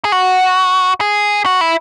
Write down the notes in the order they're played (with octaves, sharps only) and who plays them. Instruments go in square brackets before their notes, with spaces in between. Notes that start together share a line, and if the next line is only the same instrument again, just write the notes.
[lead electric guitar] G#4
F#4
G#4
F#4
E4